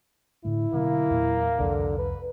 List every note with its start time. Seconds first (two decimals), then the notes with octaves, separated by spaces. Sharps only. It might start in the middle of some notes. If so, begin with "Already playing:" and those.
0.45 A2 D3 A3 E4
0.73 B2 D3 F#3 A#3
1.10 E2 A#2 F#3
1.59 C2 F2 D3
1.99 B4